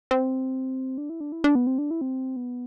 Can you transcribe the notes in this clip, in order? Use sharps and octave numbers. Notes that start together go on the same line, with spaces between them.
C4
D4
E4
D4
E4
D4
B3
C4
D4
E4
C4
B3